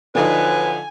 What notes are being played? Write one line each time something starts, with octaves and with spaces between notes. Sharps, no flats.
G#2 D3 F3 F#3 D#4 B4 G#5